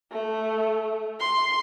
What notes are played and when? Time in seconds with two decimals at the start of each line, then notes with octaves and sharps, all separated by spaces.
0.12 A3
1.20 C6